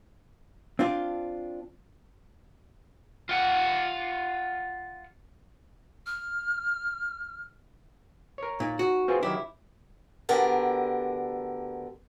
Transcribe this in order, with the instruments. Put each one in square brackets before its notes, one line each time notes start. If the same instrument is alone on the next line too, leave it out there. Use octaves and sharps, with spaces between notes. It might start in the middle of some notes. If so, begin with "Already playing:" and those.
[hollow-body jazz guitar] C4 D4 F4
[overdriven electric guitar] F4 F#5
[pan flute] F6
[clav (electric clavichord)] A#4 C#5
[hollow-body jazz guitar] A#2 [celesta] D#4
[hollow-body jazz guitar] F#4
[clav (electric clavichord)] C4 F4 G#4 [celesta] B4 G#5 C6
[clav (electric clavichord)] D#3 F#3 G4 [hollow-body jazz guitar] E4 [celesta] D6
[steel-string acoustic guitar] D2 D3 B3 G4 A#4 A5